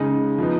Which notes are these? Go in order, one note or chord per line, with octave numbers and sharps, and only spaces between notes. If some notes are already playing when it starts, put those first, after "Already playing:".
Already playing: C#3 G#3 D#4
F3 B3 D#4